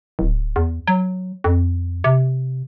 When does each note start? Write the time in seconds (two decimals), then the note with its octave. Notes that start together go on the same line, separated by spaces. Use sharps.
0.19 D1
0.56 E2
0.87 F#3
1.44 F2
2.04 C3